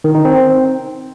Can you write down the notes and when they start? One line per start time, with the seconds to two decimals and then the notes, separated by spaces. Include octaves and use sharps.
0.04 D#3
0.15 D#4
0.25 C4